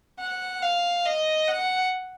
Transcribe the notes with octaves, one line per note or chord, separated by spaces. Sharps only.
F#5
F5
D#5
F#5